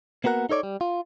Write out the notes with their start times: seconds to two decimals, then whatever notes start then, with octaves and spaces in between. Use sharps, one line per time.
0.24 A#3 B3 F#4 A#4 F#5
0.49 D#4 A4 C#5 D5
0.63 G3
0.81 F4